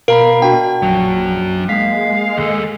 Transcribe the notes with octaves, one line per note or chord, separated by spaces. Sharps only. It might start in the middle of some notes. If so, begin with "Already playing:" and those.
B2 A#4 F5 A#5 B5
D4 F#4 G5
A#1 F#2 F#3
G#3 A#3 F5 B6
D#2 A4